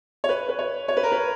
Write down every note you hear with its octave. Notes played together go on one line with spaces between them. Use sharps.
C#5
B4
B4
C#5
C#5
B4
A#4
B4